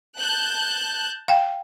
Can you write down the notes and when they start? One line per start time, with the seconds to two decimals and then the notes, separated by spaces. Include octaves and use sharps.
0.19 A5 F#6 G6
1.28 F5 G5